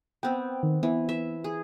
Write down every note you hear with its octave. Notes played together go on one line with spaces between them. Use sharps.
B3 C4 G5
D#3
E3 B3
E5
G#4